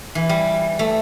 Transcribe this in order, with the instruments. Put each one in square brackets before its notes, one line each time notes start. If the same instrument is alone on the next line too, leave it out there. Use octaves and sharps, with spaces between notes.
[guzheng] E3
G3
A3